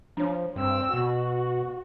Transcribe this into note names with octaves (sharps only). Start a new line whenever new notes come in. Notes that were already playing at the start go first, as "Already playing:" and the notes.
F3 D4 C#5
G2 C4 E6
B2 F#4